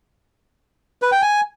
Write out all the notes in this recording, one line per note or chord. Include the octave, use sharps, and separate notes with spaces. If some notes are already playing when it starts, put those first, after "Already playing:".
B4
G5
G#5